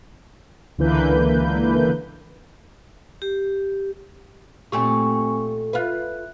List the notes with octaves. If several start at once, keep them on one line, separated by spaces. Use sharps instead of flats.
C#2 D3 E3 A#3 B4 G6
G4
A#2 A3 C4 G4 G#5 C#6
F4 B4 E5 F#6